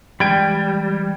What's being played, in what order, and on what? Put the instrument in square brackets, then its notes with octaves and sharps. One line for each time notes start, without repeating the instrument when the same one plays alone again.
[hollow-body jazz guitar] E3 G#3 B5 [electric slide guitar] G3 [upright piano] G5 G#6 D7